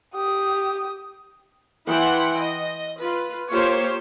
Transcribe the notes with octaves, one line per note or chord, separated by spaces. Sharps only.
G4 D#6
E3 E4 F#5 G5 C6
D#5
F4 B4
A#3 F4 G4 C5 C#5